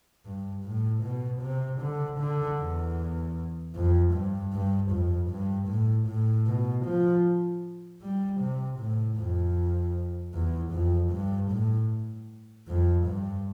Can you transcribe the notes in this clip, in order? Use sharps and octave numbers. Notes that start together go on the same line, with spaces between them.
G2
A2
B2
C3
D3
D3
E2
F2
G2
G2
F2
G2
A2
A2
B2
F3
G3
C3
A2
F2
E2
F2
G2
A2
F2
G2